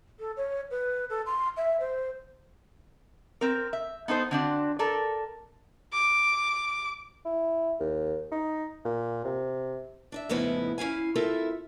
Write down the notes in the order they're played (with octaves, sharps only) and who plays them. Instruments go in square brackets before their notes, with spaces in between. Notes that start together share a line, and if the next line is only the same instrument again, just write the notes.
[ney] A4
C#5
B4
A4
C6
E5
C5
[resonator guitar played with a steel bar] C4 A#4
E5
B3 D#4 A4 C5
D3 C4 D4 F#4
A4 A#4 D5
[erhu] D6
[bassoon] E4
D#2
D#4
A#2
C3
[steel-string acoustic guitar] D4 D#5 E5
F2 A2 C#3 B3 D#4 E4
C#4 E4 F5 G#5
C4 E4 F4 A4 A#4 E5